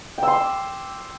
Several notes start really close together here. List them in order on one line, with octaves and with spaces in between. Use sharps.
G5 E6 C6 D6